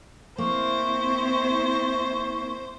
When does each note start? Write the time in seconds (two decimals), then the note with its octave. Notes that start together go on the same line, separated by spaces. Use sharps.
0.38 A#3 C4 E4 C5 C#6